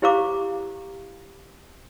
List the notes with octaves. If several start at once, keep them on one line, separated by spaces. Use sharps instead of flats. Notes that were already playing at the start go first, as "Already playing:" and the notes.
E4 G4 C5 F5 A#5 D6